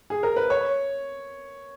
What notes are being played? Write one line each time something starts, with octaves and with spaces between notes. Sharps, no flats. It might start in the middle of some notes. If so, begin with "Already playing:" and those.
G#4
A#4
B4
C#5